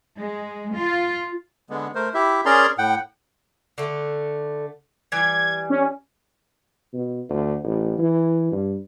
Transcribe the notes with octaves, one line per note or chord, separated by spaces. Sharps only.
G#3
F4
D3 G#3 B3
A3 A#4 C5
E4 G4 E5
C#4 G#4 A#4 D5 A#5 C6
A2 F#5 G5
D3 A3
E3 G3 G#6
C#4
B2
D2
A1
E3
G2